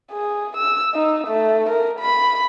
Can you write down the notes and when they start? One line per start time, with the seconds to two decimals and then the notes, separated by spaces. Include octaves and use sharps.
0.12 G#4
0.57 E6
0.94 D#4
1.27 A3
1.69 A#4
2.00 B5